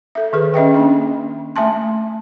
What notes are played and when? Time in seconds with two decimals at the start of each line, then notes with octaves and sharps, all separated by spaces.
0.15 A4 E5
0.33 D#3 G#4 B4
0.54 C#4 D#5 E5 G5
0.74 A#3 C#4 D4
1.56 A3 E5 G#5 A5 C6